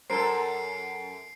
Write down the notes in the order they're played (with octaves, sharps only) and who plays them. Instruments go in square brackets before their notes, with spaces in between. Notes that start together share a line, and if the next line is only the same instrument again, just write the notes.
[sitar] F#2 A4 [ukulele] A#4 C5 [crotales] C7 D7